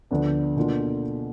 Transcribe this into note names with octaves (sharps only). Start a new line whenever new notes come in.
D2 D3 F3 B3 D4
B2 A#3 D4 F4